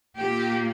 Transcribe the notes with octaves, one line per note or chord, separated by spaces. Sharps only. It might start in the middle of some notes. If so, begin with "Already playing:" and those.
A#2 A#3 G4